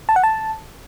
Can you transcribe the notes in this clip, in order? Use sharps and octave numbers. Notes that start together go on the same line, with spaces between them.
A5
F#5
A5